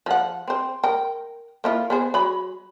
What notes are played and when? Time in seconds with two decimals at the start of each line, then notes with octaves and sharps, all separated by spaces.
0.06 F3 F#5
0.48 C4 C5
0.83 A#4 G5
1.64 A#3 E4 F4
1.90 B3 G#4 C5
2.14 F#3 B5